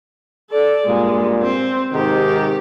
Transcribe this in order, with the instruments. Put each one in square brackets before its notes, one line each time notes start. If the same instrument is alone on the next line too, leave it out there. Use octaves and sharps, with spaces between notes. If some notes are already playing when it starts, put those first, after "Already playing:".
[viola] A4 D5
[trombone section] G2 A#2 [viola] G#3
[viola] C4
[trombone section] G#2 C3 D#3 [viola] G4